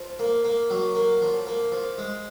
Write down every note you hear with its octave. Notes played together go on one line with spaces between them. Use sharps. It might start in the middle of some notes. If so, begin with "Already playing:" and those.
Already playing: F3
A#3
A#3
F#3
A#3
F3
A#3
F3
G#3